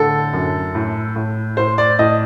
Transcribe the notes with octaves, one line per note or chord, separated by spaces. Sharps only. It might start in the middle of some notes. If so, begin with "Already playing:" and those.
Already playing: A2 D3 A4
F#2
A2
A2
A2 C5
D5
A2 D#5